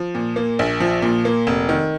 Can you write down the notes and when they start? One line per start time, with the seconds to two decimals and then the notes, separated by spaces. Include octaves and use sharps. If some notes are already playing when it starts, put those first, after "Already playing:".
Already playing: F3
0.15 A#2
0.36 A#3
0.59 A#1
0.80 F3
1.02 A#2
1.25 A#3
1.47 F1
1.69 D#3